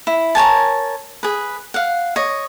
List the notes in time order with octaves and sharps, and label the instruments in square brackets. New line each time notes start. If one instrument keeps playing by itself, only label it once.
[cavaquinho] E4
A#4 C#5 G#5 A5
G#4 B4
F5 F#5
C#5 D#5